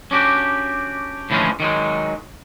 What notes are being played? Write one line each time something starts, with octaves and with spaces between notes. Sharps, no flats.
C#4 D4 F#4 G4
A2 D3 E3 F3 G#3 C#4
D#3 F#3 G#3